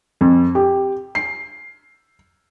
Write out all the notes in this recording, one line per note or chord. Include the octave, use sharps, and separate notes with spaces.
F2
G4
C7